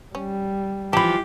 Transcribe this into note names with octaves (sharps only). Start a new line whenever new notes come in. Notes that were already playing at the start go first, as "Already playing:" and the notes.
G3 C#4
E3 F3 G4 A5 B5